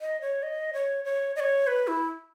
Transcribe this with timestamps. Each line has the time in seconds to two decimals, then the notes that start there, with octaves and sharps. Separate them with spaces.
0.01 D#5
0.21 C#5
0.43 D#5
0.73 C#5
1.05 C#5
1.36 D#5
1.40 C#5
1.67 B4
1.88 E4